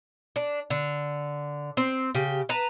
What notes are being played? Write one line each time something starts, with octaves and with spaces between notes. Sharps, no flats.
D4
D3
C4
C#3 G4
B4 A5 A#5